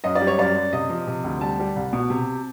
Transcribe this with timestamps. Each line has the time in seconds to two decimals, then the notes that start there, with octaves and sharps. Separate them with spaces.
0.04 F#2 D#5
0.15 D5
0.20 G3
0.27 C#5
0.38 F#2 D5
0.55 F#2
0.73 C3 D#5
0.89 F3
1.07 C3
1.24 D2
1.41 G3 A5
1.59 G3
1.76 C2
1.93 B2
2.10 C3